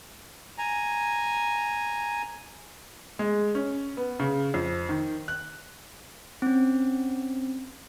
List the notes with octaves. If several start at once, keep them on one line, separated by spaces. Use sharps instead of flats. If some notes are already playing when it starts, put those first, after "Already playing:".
G#5 A#5
G#3
C#4
B3
C#3
F2
D#3
F#6
C4 C#4